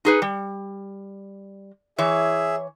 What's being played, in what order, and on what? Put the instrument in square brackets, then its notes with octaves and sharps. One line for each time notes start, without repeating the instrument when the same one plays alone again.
[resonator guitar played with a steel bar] D#4 G#4 B4
G3
[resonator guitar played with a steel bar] E3 C#5 [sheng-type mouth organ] G#4 E5